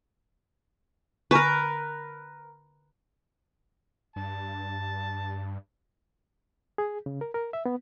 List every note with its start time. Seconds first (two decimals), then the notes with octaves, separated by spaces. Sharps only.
1.31 D3 A#4 B4 G#5 C#6
4.16 G2 A5
6.78 G#4
7.06 C#3
7.21 A#4
7.34 A#4
7.53 E5
7.66 B3